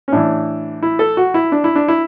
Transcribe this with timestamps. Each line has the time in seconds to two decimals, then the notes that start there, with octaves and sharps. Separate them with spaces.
0.08 C#4
0.12 A2 E3 D4
0.82 E4
0.99 A4
1.17 F#4
1.34 E4
1.52 D4
1.64 E4
1.75 D4
1.88 E4